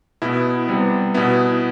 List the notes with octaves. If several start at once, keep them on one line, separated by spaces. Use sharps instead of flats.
B2 B3 E4
C3 G3 B3
B2 B3 E4